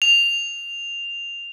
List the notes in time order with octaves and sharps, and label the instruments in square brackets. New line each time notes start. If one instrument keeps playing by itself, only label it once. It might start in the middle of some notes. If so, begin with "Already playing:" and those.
[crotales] F7